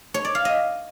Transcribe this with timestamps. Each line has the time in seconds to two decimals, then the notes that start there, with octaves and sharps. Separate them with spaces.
0.14 C#5
0.25 D5
0.35 F5
0.45 D#5